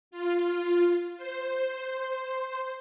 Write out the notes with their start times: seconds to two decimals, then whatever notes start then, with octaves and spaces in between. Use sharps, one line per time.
0.11 F4
1.17 C5